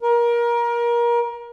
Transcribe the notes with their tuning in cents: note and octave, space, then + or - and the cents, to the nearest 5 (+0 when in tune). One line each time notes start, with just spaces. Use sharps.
A#4 +25